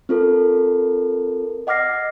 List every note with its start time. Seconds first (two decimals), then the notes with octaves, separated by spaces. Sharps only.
0.09 C4 F4 A4 A#4
1.67 D#5 F#5 D6 F6 A#6 C7